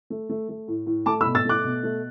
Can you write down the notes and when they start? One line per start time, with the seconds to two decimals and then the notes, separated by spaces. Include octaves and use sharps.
0.10 A3
0.29 A3
0.49 A3
0.68 A2
0.86 A2
1.06 A3 A5 D6
1.21 B5 E6
1.26 B2
1.35 E6 A6
1.45 A3 D6 F#6
1.64 B2
1.83 A3